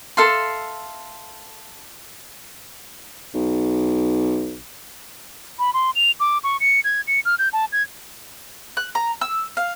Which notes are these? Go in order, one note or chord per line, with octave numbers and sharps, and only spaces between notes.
A4 E5 F5 C6
B1
B5
C6
F7
D6
C#6
C#7
G#6
C#7
F6
G6
A5
G#6
F#6
A#5
E6
F5